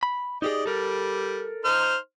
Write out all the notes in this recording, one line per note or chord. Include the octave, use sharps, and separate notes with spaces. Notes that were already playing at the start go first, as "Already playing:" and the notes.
B5
D#4 G4 G#4 D5 D#5
G3 A4 A#4
D#4 C5 F6